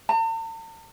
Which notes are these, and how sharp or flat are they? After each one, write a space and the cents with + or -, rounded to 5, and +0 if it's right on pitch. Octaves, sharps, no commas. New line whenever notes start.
A5 +45